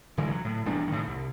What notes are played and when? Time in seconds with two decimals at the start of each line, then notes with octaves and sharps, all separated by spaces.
0.17 F1 D3 E3 G#3
0.31 F#3
0.45 A2
0.65 E1 E2 G3 D4
0.88 A2 D#3
1.07 C2